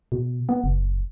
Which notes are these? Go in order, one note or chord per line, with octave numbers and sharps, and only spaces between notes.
B2
B3
F#1